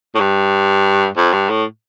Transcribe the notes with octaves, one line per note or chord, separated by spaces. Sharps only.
A2
G2
F2
G2
A2